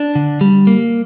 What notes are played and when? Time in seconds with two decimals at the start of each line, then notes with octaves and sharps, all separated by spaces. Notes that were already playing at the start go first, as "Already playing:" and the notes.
Already playing: D4
0.15 D3
0.41 G3
0.67 A#3